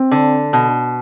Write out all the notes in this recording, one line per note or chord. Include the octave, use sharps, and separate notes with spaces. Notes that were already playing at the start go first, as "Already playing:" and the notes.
Already playing: C4
D3
B2